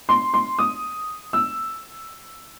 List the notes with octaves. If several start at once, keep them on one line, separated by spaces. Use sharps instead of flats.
C6
C6
D#6
E6